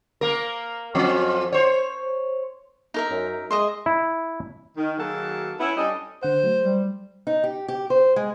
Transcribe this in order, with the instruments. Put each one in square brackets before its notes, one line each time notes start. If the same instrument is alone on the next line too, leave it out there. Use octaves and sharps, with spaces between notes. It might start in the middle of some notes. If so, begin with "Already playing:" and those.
[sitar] A#3 A#4
F2 F3 C#4
C5 C#5
[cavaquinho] D#4 A#4 E5
[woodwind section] F#2
[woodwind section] G#3 [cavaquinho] D#5 E5 C6
[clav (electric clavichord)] E4
[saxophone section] D#3
D#3 F#3 A#3 F#4 G#4 A4
B3 C#4 E4
G3 C#4 D4 A4 D#5
[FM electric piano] D3 F#5 [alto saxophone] C5
[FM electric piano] F#3 A3
[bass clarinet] G3
[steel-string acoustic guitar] D#4
G4
G4
C5
G#3